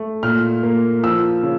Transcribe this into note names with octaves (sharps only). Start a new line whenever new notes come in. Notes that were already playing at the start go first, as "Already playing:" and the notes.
Already playing: A3
A#2 F6
A#3
F3 E6
C#3